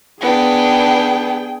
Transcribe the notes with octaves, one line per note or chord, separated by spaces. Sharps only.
B3 D4 G#4 G5